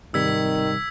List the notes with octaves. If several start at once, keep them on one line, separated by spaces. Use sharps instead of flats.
G#1 C3 D#3 G3 E6 G#6 B6